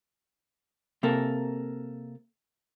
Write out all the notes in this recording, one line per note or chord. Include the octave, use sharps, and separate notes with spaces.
C3 A#3 A4 A#4